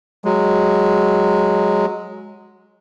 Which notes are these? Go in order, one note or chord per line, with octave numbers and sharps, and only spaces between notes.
F#3 G#3